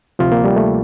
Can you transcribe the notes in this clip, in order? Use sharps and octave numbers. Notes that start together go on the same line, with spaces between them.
D2 C3 F3 F4
A#3
G3
A3